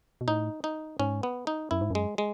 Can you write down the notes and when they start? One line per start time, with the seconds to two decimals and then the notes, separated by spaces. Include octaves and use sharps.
0.21 B2
0.28 A2 D#4
0.64 D#4
0.99 G#2 C#4
1.23 B3
1.47 D#4
1.71 F#2 E4
1.81 G#2
1.90 F#2 G#3
2.18 G#3